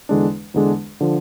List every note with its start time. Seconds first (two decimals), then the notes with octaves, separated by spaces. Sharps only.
0.09 E2 D3 G#3 D4
0.54 E2 D3 G#3 D4
1.01 D3 F3